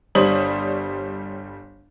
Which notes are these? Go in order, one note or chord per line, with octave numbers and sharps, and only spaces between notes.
G1 G3 C5 C#5 D#6 F#7